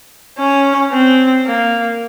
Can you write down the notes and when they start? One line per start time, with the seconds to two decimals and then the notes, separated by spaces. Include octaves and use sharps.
0.38 C#4
0.92 C4
1.46 A#3